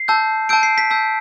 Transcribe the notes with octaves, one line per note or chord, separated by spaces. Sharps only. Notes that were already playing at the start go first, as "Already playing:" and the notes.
Already playing: C7
A5 E6 G6
A5 E6 G6 D7
C7
B6
A5 E6 G6